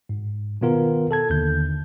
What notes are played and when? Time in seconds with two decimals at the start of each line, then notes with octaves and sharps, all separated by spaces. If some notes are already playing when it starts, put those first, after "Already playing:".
0.09 G#2
0.61 B2 D#3 B3 F4 A#4
1.11 A4 A5 G#6
1.30 D#2 D3 G6